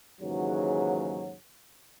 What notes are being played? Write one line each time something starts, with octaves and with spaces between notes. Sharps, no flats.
D#2 G#2 C#3 E3 F#3